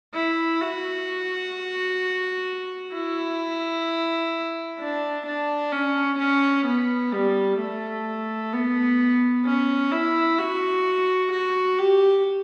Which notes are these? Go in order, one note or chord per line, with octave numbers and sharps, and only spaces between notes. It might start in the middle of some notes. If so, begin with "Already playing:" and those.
E4
F#4
E4
D4
D4
C#4
C#4
B3
G3
A3
B3
C#4
E4
F#4
F#4
G4